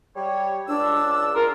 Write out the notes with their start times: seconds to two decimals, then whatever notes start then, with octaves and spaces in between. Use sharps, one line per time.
0.16 G3 C#5
0.68 C#2 D4 E6
1.36 G#2 F4 A#4